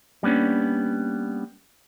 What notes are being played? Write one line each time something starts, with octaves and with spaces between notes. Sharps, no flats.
G3 A#3 B3 C#4 D4